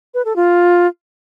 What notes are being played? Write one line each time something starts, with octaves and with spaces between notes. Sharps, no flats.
B4
A4
F4